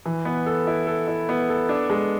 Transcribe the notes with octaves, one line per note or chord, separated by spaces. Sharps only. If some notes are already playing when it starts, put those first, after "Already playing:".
E3
B3
A4
E4
A4
E4
B3
A4
D4
G#3